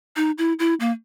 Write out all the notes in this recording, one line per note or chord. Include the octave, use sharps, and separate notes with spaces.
D#4
E4
E4
A#3